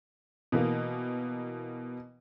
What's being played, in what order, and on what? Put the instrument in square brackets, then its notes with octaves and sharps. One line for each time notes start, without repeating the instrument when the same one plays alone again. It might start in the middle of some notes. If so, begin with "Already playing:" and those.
[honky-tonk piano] B2 E3 A#3